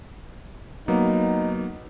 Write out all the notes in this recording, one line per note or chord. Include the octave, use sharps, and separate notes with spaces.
F#3 A#3 B3 D#4